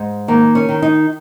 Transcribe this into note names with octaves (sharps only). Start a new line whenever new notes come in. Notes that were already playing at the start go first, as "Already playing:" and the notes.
Already playing: G#2
D#3 A#3
C#4
D#3
D#4